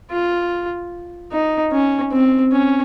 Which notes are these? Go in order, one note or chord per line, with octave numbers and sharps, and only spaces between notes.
F4
D#4
C#4
C4
C#4